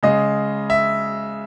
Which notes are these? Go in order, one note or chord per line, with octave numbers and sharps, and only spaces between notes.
C#3 G#3 D#5
E5